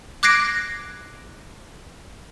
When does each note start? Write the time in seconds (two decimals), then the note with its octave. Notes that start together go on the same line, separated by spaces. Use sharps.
0.23 D6 F#6 G#6 A#6 C7 D7